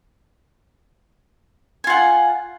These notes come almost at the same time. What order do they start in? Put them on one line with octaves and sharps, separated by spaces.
G#5 F4 F#5